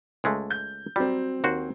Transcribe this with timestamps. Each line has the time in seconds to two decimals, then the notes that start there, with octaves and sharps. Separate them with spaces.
0.24 C#2 G#3 A3
0.50 G6
0.96 F#3 G3 C4
1.44 D#2 F#4 C5